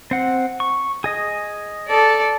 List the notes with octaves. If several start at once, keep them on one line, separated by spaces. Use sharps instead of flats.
C4 F#5
C#6
G#4 D#5
A4 D5